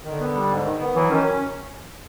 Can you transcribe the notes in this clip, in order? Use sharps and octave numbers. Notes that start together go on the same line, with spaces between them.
D3 D#3
B3
G3
G#2
D#3
B3
E3 F#3
D#3 C#4